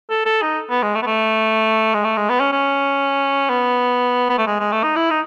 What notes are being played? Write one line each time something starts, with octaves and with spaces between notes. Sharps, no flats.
A4
A4
D#4
B3
G#3
A3
B3
A3
G#3
A3
G#3
B3
C#4
C#4
B3
B3
A3
G#3
G#3
A3
D#4
E4
D#4